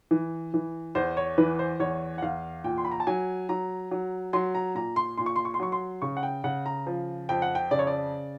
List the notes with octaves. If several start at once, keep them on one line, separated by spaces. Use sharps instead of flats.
E3
E3
E2 C5
C#5
E3 B4
C5
E2 C#5
F#5
E2 F5
A#2 G5
C6
B5
A#5
A5
F#3 G#5
F#3 A#5
F#3
F#3 C6
A#5
A#2 A#5
C6
A#2 C6
C#6
C6
C#6
C6
F#3 C#6
C6
C#3 C#6
F#5
G5
C#3 F#5
A#5
F3
F2 G5
F#5
G5
C#3 D5
C#5
D5